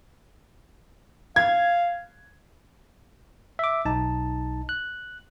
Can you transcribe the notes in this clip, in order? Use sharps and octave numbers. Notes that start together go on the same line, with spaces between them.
F5 G#6
E5 D6
B1 D#4 A5
F#6